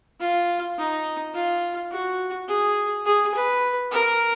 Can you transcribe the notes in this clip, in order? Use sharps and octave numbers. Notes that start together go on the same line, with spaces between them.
F4
D#4
F4
F#4
G#4
G#4
B4
A#4